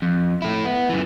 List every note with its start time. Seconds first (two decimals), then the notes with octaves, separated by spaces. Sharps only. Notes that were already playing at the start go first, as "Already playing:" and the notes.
0.02 F2
0.42 A3 E4
0.65 B3
0.89 F#2 E3